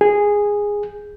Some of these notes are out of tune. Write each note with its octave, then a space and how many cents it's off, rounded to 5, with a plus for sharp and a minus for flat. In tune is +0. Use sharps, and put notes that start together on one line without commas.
G#4 -10